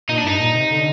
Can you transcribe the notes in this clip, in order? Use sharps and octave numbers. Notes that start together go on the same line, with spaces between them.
A#2 D#4
D4
G2 D#4
A#2
C3
D3